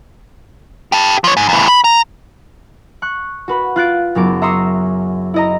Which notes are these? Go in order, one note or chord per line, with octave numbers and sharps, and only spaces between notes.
G4 A4
F3 C#5
G#2
E2 A2
B5
A#5
C#6 F#6
F#4 B4 B5
F4 F#6 A6 D7
F#1 F#2 B3 D6
E5 A#5 C6 C#6 D#6 E6
E4 D#5 A#5